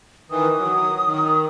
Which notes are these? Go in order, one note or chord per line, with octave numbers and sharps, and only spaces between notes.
D#3 E3 D#6
F#3
D#3